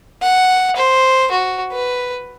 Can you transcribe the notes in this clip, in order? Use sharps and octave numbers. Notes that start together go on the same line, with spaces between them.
F#5
C5
F#4
B4